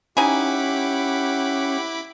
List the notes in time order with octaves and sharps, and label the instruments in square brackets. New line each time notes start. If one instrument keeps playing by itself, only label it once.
[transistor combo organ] C#4 [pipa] D#4 G#5 [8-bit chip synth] E4 B5 D6 [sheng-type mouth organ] G4 F#5